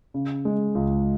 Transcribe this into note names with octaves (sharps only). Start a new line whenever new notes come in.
C#3
G#3
C#2